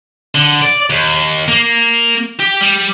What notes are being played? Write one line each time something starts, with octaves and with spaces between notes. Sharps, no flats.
D3
D5
D#2
A#3
G4
G3